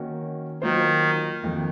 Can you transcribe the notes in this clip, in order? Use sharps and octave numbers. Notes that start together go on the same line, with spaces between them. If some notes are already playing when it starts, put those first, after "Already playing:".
Already playing: D#3 A#3 C#4 F#4
D#3 F#3 A#3 F4 C5
F2 D#3 A#3